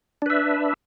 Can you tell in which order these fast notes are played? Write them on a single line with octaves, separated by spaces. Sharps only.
D4 B4 E5